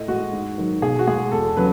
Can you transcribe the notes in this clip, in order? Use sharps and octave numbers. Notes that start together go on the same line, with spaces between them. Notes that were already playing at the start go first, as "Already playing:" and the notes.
Already playing: A2 D#5
G#3 F#4
G#2
D#3 F#3
B2 G#4
F#4
G#3 G#4
E2 A4
C#3 F#3 B4